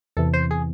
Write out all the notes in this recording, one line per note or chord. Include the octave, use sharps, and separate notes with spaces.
E2 C3 E3 A4
C5
G#4